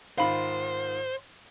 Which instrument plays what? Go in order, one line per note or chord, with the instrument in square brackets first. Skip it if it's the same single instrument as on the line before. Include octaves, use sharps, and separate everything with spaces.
[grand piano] G#2 D#3 F4 [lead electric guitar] C5 [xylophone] F5 B5 C7